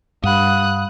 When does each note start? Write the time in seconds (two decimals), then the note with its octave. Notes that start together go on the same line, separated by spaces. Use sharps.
0.24 G2 F5 F#5 B5 D#6 F#6